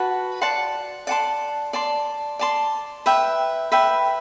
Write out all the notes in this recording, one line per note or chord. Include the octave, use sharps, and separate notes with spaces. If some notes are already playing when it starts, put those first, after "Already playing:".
Already playing: F#4 B4 F#5 A5
D5 F#5 A5 C6
D5 F#5 A5 C6
D5 A5 C6
D5 A5 C6
B4 E5 G5
B4 E5 G5